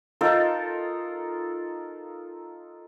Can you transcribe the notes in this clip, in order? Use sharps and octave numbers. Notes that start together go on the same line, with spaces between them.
D#4 F4 A4 A#4